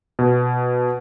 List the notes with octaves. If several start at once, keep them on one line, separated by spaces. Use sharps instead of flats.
B2